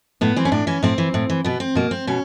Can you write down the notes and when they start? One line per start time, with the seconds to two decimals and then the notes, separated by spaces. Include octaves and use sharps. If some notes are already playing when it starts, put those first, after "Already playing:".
0.21 A2 B3
0.36 E3 C4
0.45 C#4
0.52 A2 D4
0.67 E3 C#4
0.83 A2 C4
0.98 E3
1.14 A2
1.30 E3
1.44 B2 B3
1.60 C4
1.75 B2 A#3
1.91 C4
2.07 B2 C#4